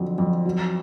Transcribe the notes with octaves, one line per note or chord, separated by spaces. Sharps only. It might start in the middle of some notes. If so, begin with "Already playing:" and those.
Already playing: F2 D3 F#3
F2
F#3